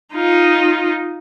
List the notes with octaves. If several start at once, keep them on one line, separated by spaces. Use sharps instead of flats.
D#4 F4